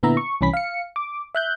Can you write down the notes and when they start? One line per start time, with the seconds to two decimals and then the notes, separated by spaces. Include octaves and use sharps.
0.03 A#2 D3 B3 E4 E5 A#5
0.17 C#6
0.41 C2 E3 C#4 B5 B6
0.53 F5 C#7
0.96 D6
1.35 E5 F#6 G6